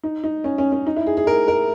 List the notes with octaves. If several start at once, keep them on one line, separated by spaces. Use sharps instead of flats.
D#4
D#4
C#4
C#4
C#4
D#4
E4
G#4
G#4
A#4
A#4